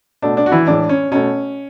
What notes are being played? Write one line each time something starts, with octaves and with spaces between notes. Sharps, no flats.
B2 A3 D4
D4
F#4
E3 E4
A2 E3 G#3 D4
C#4
B2 A3 C#4